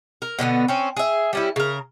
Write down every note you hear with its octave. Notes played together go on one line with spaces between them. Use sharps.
A#4
B2 D3 A#3 B3
C4 C#4
G#4 E5
G3 C#4 E4
C#3 A#4